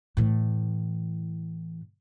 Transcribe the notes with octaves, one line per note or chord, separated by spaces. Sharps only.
A2 E3